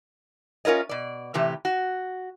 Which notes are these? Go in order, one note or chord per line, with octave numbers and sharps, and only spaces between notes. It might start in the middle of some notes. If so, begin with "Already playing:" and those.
C#4 F4 A#4 C#5 D#5
B2 D5
A2 C3 E3 G4
F#4